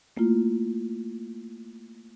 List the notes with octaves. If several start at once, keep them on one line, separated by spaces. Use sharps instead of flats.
A3 A#3 E4 F4